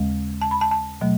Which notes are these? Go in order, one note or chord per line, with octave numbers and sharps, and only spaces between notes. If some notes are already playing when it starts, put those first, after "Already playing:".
Already playing: D#2 C#3 G#3
A5
B5
A5
A5
B2 F#3 A3